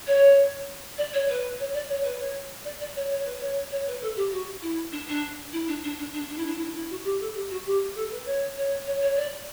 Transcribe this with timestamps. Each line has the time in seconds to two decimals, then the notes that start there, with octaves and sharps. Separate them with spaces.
0.06 C#5
0.97 D5
1.13 C#5
1.28 B4
1.59 C#5
1.73 D5
1.88 C#5
2.03 B4
2.19 C#5
2.64 D5
2.80 D5
2.94 C#5
3.09 C#5
3.25 B4
3.40 C#5
3.70 C#5
3.86 B4
4.01 A4
4.15 G4
4.31 F#4
4.61 E4
4.91 D4
5.07 D4
5.52 E4
5.67 D4
5.83 D4
5.98 D4
6.13 D4
6.28 D4
6.37 E4
6.45 D4
6.55 E4
6.64 D4
6.74 E4
6.89 F#4
7.03 G4
7.19 A4
7.35 G4
7.50 F#4
7.65 G4
7.94 A4
8.10 B4
8.25 C#5
8.56 C#5
8.86 C#5
9.01 C#5
9.16 D5